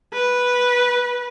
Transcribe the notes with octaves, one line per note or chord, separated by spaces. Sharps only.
B4